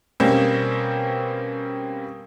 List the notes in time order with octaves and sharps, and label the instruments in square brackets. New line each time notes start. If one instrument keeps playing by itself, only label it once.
[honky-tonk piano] B2 G3 A#3 C4 C#4